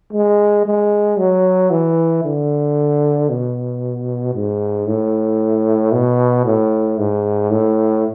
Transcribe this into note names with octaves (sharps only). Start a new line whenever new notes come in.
G#3
G#3
F#3
E3
D3
B2
G#2
A2
B2
A2
G#2
A2